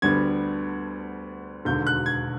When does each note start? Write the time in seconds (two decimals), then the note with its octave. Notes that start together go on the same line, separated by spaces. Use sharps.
0.02 D2 D3 G3 B3 G#6
1.65 E1 D#2 D3 G6
1.87 F#6
2.06 G#6